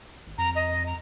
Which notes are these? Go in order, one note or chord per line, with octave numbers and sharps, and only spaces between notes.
G#1
F2 A#5
D#5
A#5